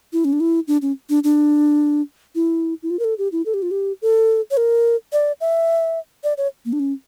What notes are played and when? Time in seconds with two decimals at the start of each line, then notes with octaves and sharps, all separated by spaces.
0.13 E4
0.25 C#4
0.33 D4
0.40 E4
0.68 D4
0.82 C#4
1.10 D4
1.24 D4
2.35 E4
2.83 E4
2.90 F4
2.99 A#4
3.04 A4
3.18 G4
3.32 E4
3.46 A4
3.54 G4
3.62 F4
3.71 G4
4.02 A4
4.51 C#5
4.57 A#4
5.13 D5
5.41 E5
6.24 D5
6.38 C#5
6.65 A#3
6.73 D4
6.80 C#4